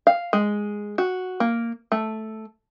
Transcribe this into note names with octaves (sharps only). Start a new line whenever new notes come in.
F5
G#3
F#4
A#3
A3